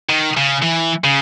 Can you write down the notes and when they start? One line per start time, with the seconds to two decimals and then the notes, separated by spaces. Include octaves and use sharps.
0.09 D#3
0.37 C#3
0.63 E3
1.04 C#3